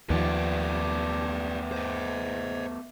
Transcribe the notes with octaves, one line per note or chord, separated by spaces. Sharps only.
D#2 F3 A3 B3 G4 B4 D5
C5 D#5